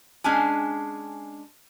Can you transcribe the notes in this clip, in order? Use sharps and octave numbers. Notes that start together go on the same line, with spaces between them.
G#3 C#4 D4 G#5